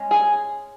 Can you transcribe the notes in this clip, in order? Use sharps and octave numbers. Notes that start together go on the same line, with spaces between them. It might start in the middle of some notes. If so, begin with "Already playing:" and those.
Already playing: G#3 C#4
G#4